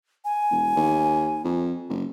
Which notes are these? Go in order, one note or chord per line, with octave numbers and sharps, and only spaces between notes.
G#5
E1
D#2
F2
F#1